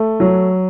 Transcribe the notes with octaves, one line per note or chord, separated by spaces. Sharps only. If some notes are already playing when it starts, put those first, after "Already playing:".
Already playing: A3
F#3